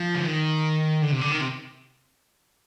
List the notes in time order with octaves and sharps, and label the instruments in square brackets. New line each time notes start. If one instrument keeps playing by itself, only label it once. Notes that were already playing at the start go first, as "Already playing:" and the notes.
Already playing: [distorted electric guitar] F3
D3
D#3
D3
C3
D3
D#3
C3